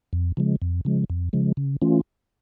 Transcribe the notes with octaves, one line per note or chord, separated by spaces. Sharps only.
F2
C#3 F3 G#3
F2
C#3 F3 G#3
F2
C#3 F3 G#3
C#3
E3 A3 C#4 F4